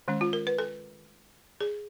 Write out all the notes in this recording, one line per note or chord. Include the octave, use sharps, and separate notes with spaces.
D#3 G#3 C#4
F4
A#4
B4
A4
G#4